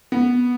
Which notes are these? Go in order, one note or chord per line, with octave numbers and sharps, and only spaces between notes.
B3